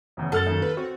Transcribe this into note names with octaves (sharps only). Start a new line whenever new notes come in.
F1 E2 C#3
F#2 A4 F#5 F6 A6
D#2
B4
C4 F#4